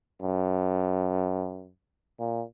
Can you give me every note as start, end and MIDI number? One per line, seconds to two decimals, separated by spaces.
0.22 1.70 42
2.20 2.43 46